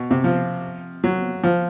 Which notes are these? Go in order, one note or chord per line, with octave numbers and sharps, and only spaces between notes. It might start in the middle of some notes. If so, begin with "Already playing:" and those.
Already playing: B2
C3
F3
F#3
F3